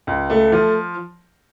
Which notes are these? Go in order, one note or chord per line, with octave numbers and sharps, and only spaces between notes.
C#2
A3
F3